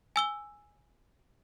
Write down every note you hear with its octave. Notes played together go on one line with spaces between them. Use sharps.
G#5 E6 G7